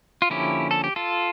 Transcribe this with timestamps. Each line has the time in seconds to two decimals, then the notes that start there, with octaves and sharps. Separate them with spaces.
0.22 F4
0.30 D3 F3 A#3 C#4 E4 G4
0.71 A4
0.84 G4
0.96 F4 A4